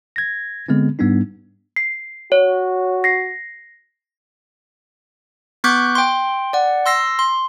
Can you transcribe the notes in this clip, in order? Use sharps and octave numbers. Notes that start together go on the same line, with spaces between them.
G#6 A#6
D3 G#3 B3 C4
G#2 G3 B3 D4 D#4
C7
F#4 C#5
A#6 C7
B3 C#6 D6 F#6 G6 B6
G5 C6
D5 F#5
C6 E6 A#6 C7
C6